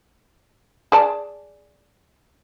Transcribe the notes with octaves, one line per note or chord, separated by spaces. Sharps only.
G#4 D5 A5